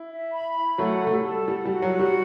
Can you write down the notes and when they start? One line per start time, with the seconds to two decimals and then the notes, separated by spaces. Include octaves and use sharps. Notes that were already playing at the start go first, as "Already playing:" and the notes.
Already playing: E4
0.09 E5
0.33 B5
0.56 E4
0.78 F#3 A3 F#5
1.02 A4
1.07 A3
1.13 G3
1.24 A4
1.47 G3 F#5
1.66 G3
1.71 F#4
1.82 F#3
1.94 F#4
2.00 G3